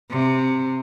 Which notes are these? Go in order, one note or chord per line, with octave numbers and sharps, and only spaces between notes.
C3